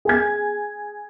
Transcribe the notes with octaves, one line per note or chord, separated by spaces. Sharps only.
G#4 G#5 G#6